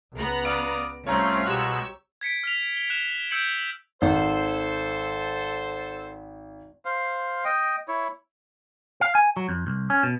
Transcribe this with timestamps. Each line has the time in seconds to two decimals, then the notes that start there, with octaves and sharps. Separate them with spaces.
0.14 C#2 B3 A#5
0.45 D5 F5 D#6 D7
1.06 C2 A3 C4 C#4 F4 C#5 F5 A#5
1.45 B2 G#3 G4 C#6 E6 F#6
2.21 G#6 B6 C#7 D7
2.43 F6 B6 F7
2.75 G7
2.90 F#6 E7
3.18 G7
3.31 E6 G6 G#6 C#7 D7 F#7
4.02 G#1 A4 C5
6.85 C5 F5
7.45 D#5 G5
7.88 E4 C#5
9.01 F5
9.15 G#5
9.37 F#3
9.49 F2
9.67 C2
9.90 C#4
10.03 B2